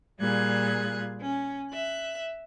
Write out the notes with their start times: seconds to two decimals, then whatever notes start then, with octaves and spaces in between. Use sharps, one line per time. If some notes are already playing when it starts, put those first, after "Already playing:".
0.20 A#2 G3 F4 G#4 F#6 G#6
1.21 C#4
1.70 E5 F#6